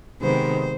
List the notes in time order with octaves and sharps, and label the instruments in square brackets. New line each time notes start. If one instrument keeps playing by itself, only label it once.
[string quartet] C3 D#3 G#3 B3 C5